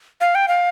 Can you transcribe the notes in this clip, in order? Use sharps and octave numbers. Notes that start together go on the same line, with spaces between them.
F5
G5
F5